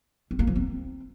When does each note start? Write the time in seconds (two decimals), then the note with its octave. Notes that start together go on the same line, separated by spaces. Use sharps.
0.31 C4
0.39 A#3
0.47 F3
0.56 C4